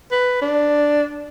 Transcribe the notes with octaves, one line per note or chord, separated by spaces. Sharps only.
B4
D4